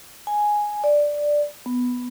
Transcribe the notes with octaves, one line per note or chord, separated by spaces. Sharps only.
G#5
D5
B3